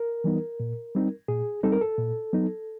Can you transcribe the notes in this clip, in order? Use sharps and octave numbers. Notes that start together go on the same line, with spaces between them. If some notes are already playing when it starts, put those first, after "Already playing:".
Already playing: A#4
E3 G3 B3 D#4
A#2
G3 C4 D#4
A#2 G#4
G3 C4 D#4 A4
A#4
A4
A#2
F#3 B3 D#4